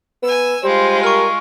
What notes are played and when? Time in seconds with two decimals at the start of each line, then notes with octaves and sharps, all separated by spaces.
0.23 B3 G#5 E6
0.64 G3 G#3 F4 C5
1.03 A#4 C#6 F6